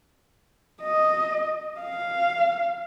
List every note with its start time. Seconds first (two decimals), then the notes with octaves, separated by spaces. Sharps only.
0.83 D#5
1.80 F5